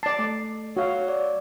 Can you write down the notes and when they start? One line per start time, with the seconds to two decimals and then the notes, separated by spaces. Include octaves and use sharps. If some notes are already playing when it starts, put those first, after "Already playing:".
0.03 D5 A5 C7
0.19 A3
0.77 F#3 F#4 F5
1.08 D5